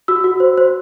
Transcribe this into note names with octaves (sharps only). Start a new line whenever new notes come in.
F#4 E6
F#4
C5
C5